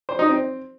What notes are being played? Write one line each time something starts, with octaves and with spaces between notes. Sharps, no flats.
C5
D#4
C4